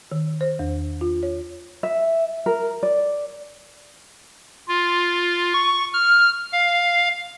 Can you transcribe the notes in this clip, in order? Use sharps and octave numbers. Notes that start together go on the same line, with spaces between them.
D#3
C5
E2
F4
C#5
E5
A#4
D5
F4
C#6
F6
F5